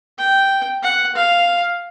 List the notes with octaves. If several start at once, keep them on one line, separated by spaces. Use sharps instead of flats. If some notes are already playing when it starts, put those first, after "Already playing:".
G5
F#5
F5